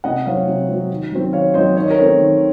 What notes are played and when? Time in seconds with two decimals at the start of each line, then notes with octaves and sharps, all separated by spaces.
0.04 C3 D#5 F#5
0.26 F#3 C4 C#5 F5
0.47 C3
0.68 F#3 C4
0.91 D#3
1.12 F#3 C4
1.33 D#3 C#5 F5
1.54 F#3 C4 C5 D#5
1.76 D#3 C#5
1.83 D#5
1.90 A#4 C#5
1.97 A3 C4
2.19 D#3